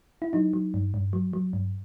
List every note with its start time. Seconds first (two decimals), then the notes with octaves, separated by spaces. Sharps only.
0.22 E4
0.33 F#3 D#4
0.53 F#3
0.74 G2
0.94 G2
1.13 F#3
1.33 F#3
1.53 G2